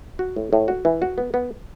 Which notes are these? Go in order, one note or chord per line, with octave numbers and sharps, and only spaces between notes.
F#4
A2
A2
F#4
E3
F#4
B3
B3